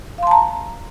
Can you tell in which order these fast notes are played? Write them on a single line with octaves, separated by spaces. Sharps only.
F5 C6 A5 A#5